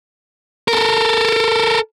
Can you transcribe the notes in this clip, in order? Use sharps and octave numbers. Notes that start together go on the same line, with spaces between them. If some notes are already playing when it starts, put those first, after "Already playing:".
A4 A#4